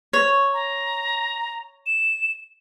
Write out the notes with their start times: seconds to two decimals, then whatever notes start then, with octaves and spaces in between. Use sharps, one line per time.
0.13 C#5
0.54 A#5
1.86 E7